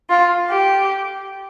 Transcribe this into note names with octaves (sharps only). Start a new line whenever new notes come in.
F4
G4